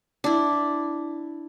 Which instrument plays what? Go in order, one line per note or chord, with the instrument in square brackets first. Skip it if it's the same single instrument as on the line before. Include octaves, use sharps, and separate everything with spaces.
[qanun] D4 E4